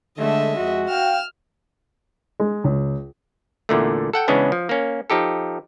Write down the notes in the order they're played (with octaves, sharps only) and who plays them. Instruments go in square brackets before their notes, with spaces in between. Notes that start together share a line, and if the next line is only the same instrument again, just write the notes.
[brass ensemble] D3 [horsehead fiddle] G#3 A3 [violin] D#5 E5
[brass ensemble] F2 G#3 G#4 [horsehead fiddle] F#4
[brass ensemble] F5 G5 [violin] F6 E7
[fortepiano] G#3
C#2
[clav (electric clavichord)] E2 A#2 D3 A3
A4 F#5 G5
C#3 E3 G#3 B3 C#4 D4
F3
A#3 C#4
F3 D#4 G4 A4